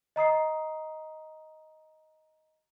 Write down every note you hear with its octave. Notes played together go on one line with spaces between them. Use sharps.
D#5 A#5 D#6 C7